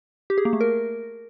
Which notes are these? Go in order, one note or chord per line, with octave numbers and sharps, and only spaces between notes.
G4
G#4
A#3
A3
A#4